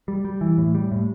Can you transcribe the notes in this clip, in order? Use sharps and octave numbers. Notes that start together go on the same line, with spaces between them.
G3
G3
E3
A2
G3
A2